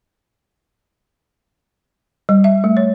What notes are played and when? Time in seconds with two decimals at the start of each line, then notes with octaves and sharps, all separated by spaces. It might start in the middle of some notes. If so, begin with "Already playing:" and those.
2.29 G3
2.44 E5
2.64 A3
2.77 C#5